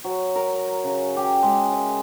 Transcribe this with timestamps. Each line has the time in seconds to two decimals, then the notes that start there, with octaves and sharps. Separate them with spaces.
0.04 F#3
0.36 A#4
0.84 C#3
1.17 G4
1.43 G#3
1.73 E5